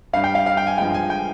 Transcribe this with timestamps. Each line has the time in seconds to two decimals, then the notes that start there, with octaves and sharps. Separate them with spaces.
0.13 G2 G3 F5
0.24 G5
0.35 F5
0.46 F5
0.57 G5
0.67 G#5
0.78 G2 F3 G#3 G5
0.94 G#5
1.10 G5